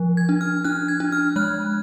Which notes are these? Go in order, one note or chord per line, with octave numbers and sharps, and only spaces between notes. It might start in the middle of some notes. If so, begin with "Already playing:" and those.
Already playing: F3
G#6
D4
F6
D4 F#6
G#6
D4
F6
G#3 F#6